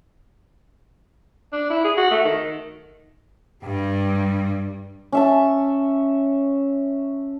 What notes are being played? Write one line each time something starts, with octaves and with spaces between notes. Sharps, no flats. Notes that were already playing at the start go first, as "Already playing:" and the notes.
D4
E4
G#4
F#4
A3
D#3
G2 G3
C#4 E5 A5